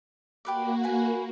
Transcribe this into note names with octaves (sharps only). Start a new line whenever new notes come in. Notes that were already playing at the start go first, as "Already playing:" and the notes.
A#3 F#4 G4 B4 D5
B4 G#5